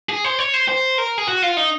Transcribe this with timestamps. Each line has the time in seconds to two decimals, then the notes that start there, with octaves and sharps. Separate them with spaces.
0.09 G#4
0.24 C5
0.39 C#5
0.54 C5
0.69 C5
0.98 A#4
1.18 G#4
1.28 F#4
1.42 F4
1.57 D#4